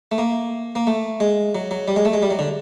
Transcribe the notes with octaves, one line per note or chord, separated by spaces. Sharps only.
A3
A#3
A#3
A3
G#3
F#3
F#3
G3
G#3
A3
G#3
G3
F#3
D3